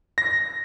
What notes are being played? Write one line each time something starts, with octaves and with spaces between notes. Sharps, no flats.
A#6